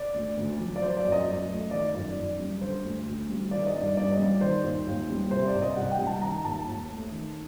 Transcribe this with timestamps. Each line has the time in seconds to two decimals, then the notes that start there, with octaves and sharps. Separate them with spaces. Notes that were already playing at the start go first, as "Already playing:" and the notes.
Already playing: D5
0.14 D2
0.37 D2
0.59 F#3
0.76 D5
0.81 F#3 C5
0.97 D5
1.04 F#2
1.12 D#5
1.26 F#2
1.49 A3
1.71 D#3 D5
1.94 F#2 D5
2.17 F#2
2.40 G3
2.61 D3 C5
2.84 D2
3.06 D2
3.29 G3
3.51 D#3 D5
3.62 D5
3.66 D#5
3.74 G2
3.81 D5
3.97 G2 D5
4.12 D#5
4.19 G3
4.26 D5
4.41 D#3 C5
4.64 D#2
4.87 D#2
5.09 G3
5.31 C3 C5
5.47 D5
5.54 C2
5.62 D#5
5.76 C2 F#5
5.91 G5
5.99 G3
6.07 A5
6.22 D#3 A#5
6.44 D#2 A5
6.67 D#2
6.89 A3
7.12 D#3